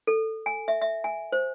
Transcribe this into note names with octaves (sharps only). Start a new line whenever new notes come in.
A4
G#5
E5
E5
G#5
C5